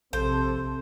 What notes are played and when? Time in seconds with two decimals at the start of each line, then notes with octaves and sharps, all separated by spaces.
0.13 A#1 C3 A4 C5